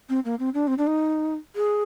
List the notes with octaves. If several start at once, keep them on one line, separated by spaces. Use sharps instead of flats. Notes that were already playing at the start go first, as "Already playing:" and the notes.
C4
A#3
C4
D4
C4
D4
D#4
G#4